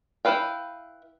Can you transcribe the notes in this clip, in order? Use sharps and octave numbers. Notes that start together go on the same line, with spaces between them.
E4 A4 B4 F5 G5